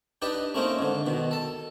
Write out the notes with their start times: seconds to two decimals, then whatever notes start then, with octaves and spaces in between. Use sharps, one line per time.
0.22 D4 D#4 G4 B4 A5
0.54 A3 A#3 C4 C#4 D#4
0.79 G#2 D3
1.06 B2 D#3
1.31 A4 A5